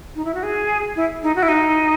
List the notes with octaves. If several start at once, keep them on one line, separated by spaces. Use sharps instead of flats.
D#4
E4
F#4
G#4
E4
D#4
F#4
E4
D#4